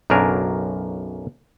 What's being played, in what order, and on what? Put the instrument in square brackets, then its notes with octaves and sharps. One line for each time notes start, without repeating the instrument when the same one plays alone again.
[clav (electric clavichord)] B1 F#2 C#3 D4 A#4 G#5